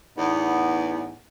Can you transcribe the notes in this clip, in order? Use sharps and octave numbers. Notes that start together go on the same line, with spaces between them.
E2 A2 B3 D#4